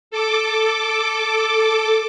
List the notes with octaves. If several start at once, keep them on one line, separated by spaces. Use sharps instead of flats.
A4 D6